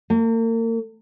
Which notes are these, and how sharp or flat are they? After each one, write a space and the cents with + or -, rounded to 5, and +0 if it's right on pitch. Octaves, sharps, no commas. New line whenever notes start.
A#3 -40